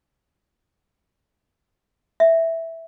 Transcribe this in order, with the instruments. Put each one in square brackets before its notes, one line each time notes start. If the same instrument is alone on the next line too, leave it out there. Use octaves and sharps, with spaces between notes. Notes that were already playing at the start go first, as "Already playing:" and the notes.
[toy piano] E5